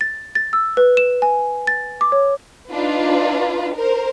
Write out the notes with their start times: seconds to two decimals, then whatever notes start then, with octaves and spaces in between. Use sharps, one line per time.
0.01 A6
0.35 A6
0.53 E6
0.77 B4
0.97 E7
1.22 G#5
1.67 A6
2.01 D6
2.12 C#5
2.71 D4 D#4 F4 B4
3.76 A#4 C5